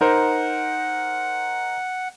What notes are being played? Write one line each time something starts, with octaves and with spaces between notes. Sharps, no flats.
D#4 A#4 C5 F#5